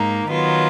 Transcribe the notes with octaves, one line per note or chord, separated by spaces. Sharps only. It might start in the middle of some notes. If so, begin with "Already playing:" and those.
Already playing: G#2 A#3 D#4
D#3 F#3 B3 F4